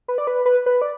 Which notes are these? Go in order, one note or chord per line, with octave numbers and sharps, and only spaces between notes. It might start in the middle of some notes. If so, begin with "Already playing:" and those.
B4
D5
B4
B4
B4
D5